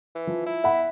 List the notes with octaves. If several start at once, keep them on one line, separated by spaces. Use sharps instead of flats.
E3
F3
E4
E5 F#5 B5